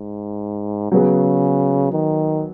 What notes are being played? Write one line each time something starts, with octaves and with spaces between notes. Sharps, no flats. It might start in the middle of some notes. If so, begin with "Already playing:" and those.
Already playing: G#2
C#3 F#3 B3 G#4
D#3